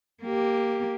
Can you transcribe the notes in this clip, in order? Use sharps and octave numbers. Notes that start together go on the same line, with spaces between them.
A#3 G4